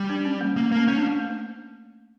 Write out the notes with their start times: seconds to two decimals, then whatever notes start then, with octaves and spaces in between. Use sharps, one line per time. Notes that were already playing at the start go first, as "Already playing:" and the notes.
Already playing: G3
0.10 D4
0.25 C#4
0.41 A#3
0.56 A3 A#3
0.72 A#3 C#4
0.88 A#3 C#4
0.98 D4
1.02 A3
1.19 A#3